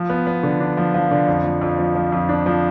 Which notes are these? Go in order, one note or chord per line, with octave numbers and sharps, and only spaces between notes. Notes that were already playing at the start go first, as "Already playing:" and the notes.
Already playing: F3
B3
B3
D3
D4
F3
F3
D3
F2
F3
F2
F3
F3
F2
D4
F3